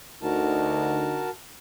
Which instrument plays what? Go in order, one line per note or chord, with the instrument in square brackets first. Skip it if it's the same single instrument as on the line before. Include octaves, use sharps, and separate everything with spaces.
[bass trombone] D2 [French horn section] D3 D#4 [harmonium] F#4 A#4 A5